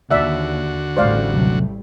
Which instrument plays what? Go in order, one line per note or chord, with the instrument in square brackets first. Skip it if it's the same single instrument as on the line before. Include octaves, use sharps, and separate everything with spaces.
[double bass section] D#2 [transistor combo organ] D3 F#4 [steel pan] D5 E5 F#5
[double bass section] A1 G3 A3 [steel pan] C5 D5 F5
[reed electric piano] D#2 C3 F#3